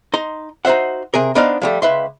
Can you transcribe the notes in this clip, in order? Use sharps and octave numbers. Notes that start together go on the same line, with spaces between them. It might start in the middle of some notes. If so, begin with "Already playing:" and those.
D#4 A#5 C6
D#4 F#4 C5 E5 F#5
C3 G#4 A#4
B3 D4 D#4 C5 D#5 F5
F3 G3 A3
C#2 B4 E5 C6